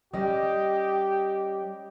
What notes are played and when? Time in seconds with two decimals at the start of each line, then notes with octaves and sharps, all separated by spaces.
0.13 G3 C#4 G4 D#5